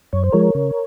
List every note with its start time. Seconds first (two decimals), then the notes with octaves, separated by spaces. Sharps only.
0.13 F#2 C#5
0.24 C5
0.33 F3 G#3 A#4 C#5
0.55 C#3